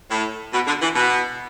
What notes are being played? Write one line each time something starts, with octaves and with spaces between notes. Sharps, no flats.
A2
B2
D3
E3
B2